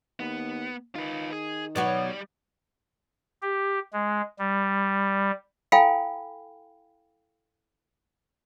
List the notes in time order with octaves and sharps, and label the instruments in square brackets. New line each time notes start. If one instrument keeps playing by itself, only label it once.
[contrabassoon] D#2 [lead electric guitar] B3
[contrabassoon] D#3 [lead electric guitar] F4 B4
[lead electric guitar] G#4
[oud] B2 F#3 F#4 [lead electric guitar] G3 D5
[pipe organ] G4
G#3
G3
[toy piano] E4 A4 F5 G5 G#5 B5